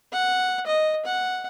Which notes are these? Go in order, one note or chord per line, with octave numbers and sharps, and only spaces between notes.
F#5
D#5
F#5